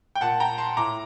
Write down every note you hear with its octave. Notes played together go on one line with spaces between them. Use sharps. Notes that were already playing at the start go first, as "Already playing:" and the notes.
G5
A#2 F#5 A5
G5 A#5
A5 C6
A2 A#5 D6